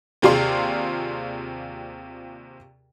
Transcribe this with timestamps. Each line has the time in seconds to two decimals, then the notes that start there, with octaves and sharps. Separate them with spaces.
0.22 D#2 C3 F4 G#4 D5 C6